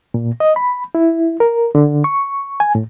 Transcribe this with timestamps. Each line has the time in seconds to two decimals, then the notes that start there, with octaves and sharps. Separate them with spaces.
0.14 A#2
0.40 D#5
0.56 B5
0.95 E4
1.40 A#4
1.75 D3
2.04 C#6
2.60 G#5
2.75 A2